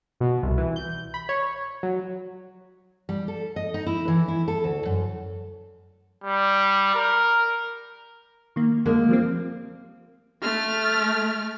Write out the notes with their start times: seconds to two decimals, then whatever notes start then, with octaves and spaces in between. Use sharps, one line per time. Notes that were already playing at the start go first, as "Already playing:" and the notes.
0.20 B2
0.43 C2
0.58 E3
0.76 G6
1.14 B5
1.29 C#5
1.83 F#3
3.09 G3
3.28 A4
3.56 D#5
3.74 D#4
3.86 E4
4.08 E3
4.28 E4
4.48 A4
4.64 D2
4.85 F#2
6.24 G3
6.95 A#4
8.56 D#3 A#3
8.86 D3 G#3 A#3
9.09 F3 G3 C4
10.42 A3 F6